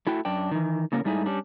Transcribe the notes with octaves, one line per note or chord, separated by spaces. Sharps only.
A3 E4 F#4 G5
F#2 D4 G5
D#3 E3
A2 C#3 A#3 C#4 A#4
G#2 G3 A3 D#4 E4 G#4
G3 C#4 D4